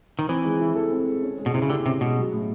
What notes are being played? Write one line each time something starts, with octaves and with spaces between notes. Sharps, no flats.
D#3
E3 C4
G#3
E4
A4
C4
G#3
C#4
G#3
B2
C3 E4
C#3
D3 G4
C3 C#4
B2 G#3
F#3
A2